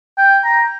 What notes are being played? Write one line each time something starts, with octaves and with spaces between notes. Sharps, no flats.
G5
A#5